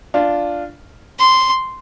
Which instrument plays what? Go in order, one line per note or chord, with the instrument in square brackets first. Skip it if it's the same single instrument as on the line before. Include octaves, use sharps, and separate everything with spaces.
[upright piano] D4 F4
[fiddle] C6